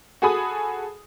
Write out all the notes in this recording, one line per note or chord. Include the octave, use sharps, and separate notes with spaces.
F#4 G#4 A4 G#5 B5 D#6